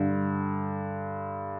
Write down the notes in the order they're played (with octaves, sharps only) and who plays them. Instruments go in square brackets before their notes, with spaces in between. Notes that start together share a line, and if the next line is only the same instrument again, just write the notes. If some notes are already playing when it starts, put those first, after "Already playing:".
Already playing: [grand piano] G2 D3